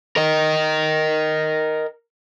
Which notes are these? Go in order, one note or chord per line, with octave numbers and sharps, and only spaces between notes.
A#4 D#5